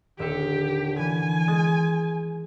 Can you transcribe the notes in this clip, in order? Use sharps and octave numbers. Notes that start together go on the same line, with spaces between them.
D#1 D3 G4 E5 C#7
E3 G#5
G#3 D#6 A6